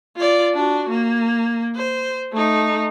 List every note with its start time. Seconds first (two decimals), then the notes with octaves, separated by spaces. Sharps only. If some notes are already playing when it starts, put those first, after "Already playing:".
0.17 F4 D5
0.55 D4 F#4
0.90 A#3
1.76 C5
2.33 A3 D#4